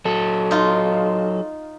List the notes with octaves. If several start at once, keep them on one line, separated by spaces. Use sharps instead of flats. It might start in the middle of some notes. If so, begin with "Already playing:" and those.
F#3 A4
D#4 F4